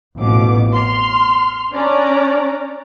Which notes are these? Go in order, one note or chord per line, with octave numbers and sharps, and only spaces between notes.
A1 F2 B2 D6
C6 F6
C#4 D4 D5 A#5